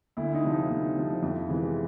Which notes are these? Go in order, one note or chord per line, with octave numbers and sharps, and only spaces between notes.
D2 E4
D#4
C3 F3
D#4
D2
C3 F3
F2 E4
C3 E3 G#3 B3